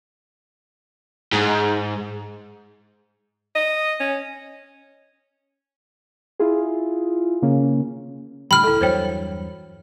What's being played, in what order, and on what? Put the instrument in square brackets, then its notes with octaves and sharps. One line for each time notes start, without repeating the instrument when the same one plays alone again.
[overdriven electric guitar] G#2
[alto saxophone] D#5
C#4
[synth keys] E4 F4 G#4
C#3 A#3 C#4
[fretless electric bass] A2 D3 G3 [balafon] G5 [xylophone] B5 F6
[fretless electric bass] C#2 [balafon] E4 A4
[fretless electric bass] E2 G2 F#3 [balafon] C5 C#5 G5